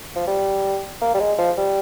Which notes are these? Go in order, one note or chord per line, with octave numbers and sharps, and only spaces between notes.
F3
G3
A#3
G3
G#3
F3
G3